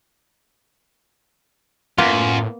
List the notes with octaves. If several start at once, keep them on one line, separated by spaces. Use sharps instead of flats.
F#2 A2 A#3 B3 F4